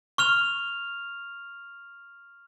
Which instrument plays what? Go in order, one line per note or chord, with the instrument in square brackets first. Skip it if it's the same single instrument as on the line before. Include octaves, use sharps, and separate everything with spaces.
[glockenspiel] C#6 F6 F7